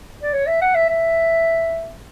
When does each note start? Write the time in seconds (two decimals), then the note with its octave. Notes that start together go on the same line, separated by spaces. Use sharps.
0.22 D5
0.33 C#5
0.47 E5
0.61 F#5
0.75 E5
0.89 E5